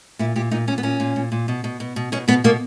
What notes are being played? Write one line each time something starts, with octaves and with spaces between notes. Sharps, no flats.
A#2 E4
A#2 G4
A#2 D#4
A#2 C#4
B3
A#2 C#4
A#2
A#2
A#2
B2
B2
B2
B2
B2 C#4
B2 B3
B2 A#3